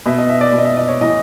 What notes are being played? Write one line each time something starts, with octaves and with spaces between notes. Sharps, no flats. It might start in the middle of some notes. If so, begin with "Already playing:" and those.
B2 E5
D#5
E5
D5
B2
D#5
E5
D#5
C#5
A2 E3 D#5